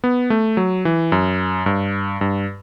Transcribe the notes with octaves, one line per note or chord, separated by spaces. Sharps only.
B3
A3
F#3
E3
F#2
G2
G2